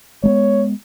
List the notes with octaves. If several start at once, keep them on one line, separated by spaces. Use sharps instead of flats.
G#3 A3 B3 C#5